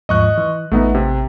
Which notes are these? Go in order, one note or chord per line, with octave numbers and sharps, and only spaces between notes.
D#2 G#2 F3 D#5 C#6 F#6
E3
A1 A3 B3 D#4
C3